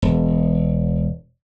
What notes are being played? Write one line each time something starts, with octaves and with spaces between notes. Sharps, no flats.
E1